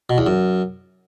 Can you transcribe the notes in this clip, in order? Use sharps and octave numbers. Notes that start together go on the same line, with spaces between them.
B2
E2
F#2